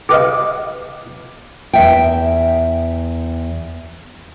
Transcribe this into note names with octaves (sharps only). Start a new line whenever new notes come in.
G4 B4 D#5 F5
E2 E5 G5